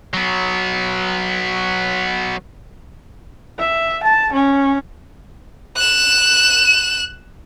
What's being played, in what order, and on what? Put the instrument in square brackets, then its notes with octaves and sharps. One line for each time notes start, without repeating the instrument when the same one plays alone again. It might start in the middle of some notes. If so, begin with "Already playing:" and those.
[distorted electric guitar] F#3 B3
[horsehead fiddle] E5
A5
C#4
[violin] F#6 E7